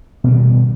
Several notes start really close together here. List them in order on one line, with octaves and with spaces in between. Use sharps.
B2 G3 D#3